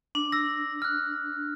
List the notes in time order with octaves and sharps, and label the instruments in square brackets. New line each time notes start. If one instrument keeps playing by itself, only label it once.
[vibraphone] D4
[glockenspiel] E6 A#6
F6 F#6